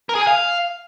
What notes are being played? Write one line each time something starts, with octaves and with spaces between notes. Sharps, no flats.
A#4
G#4
G#5
F5